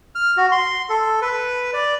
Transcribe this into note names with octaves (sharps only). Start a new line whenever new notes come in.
F6
F#4
C6
A4
B4
D5